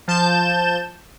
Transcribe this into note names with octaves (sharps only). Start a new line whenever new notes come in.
F3 A5 G6 E7